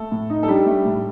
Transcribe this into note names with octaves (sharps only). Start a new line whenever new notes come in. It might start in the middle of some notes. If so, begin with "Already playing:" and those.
Already playing: A3 A4
A2
D#4
A4
G3 D4 G4
A3
A2